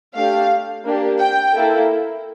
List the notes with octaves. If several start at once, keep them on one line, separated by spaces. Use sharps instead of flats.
A3 D4 G4 F5
A#3 D4 G4
G5
A#3 E4 A4